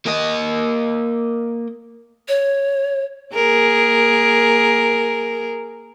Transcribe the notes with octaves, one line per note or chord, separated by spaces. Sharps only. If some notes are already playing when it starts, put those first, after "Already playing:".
A#3 D#5
C#5
A#3 G#4 A#4